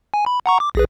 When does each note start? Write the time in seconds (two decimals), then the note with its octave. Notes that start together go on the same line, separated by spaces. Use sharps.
0.14 G#5
0.26 B5
0.46 F#5 A#5 C#6
0.60 D6
0.75 A#1 G#4 B4